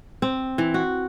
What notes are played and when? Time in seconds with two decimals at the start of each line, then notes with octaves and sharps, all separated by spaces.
0.22 C4
0.58 E3
0.74 F#4